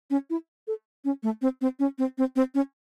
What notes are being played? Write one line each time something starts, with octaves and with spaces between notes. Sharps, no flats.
C#4
E4
A4
C#4
A3
C4
C4
C#4
C4
C4
C4
C#4